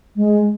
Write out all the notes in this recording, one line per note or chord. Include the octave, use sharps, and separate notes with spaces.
G#3